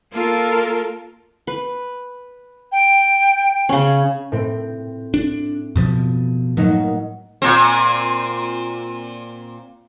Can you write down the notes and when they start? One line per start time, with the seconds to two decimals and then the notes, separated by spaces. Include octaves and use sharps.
0.11 A#3 F4 A4 A#4
1.47 B4
2.72 G5
3.69 C#3 C#4
4.32 A2 C4
5.14 D4
5.76 F#2 B2 F3
6.57 A2 F#3 A#3 D#4
7.42 A#2 C4